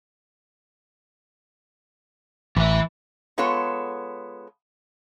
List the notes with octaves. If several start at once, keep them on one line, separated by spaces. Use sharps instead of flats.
A1 E3 E5
G#3 B3 F4 A4 C#5